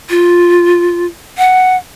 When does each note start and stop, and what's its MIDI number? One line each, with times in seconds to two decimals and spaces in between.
0.10 1.06 65
1.38 1.77 78